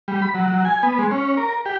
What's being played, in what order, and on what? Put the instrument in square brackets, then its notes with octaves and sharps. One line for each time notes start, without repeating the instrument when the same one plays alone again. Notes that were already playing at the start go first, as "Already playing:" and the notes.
[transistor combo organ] G3
B5
F#3
F#3
G#5
B3
G#3
C#4
A#4
G4